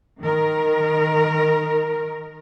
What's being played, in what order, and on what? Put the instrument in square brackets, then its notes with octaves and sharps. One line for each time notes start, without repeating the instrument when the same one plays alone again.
[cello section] D#3 A#4